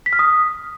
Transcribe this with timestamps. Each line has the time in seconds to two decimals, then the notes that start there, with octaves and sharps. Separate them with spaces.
0.06 B6
0.13 F6
0.19 D#6